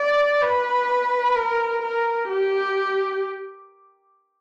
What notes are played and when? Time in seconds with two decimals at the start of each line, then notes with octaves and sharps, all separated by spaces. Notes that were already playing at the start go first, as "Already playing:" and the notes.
Already playing: D5
0.42 B4
1.35 A#4
1.82 A#4
2.29 G4